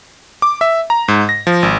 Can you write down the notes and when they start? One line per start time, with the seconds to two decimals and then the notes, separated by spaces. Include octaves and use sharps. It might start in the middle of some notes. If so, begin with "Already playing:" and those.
0.42 D6
0.61 E5
0.90 A#5
1.08 G#2
1.29 A#6
1.47 F3
1.63 G#1